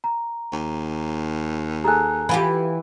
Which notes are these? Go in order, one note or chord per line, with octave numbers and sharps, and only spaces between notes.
A#5
D#2
G#4 A4 G#5 A#5 F#6
E3 F4 G4 B5